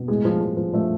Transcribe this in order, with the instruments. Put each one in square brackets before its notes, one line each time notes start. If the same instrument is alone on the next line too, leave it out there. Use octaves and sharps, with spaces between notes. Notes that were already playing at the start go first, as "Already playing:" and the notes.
Already playing: [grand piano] B2
A2 G#3 G#4
F3
F3
F3
F3 A3 A4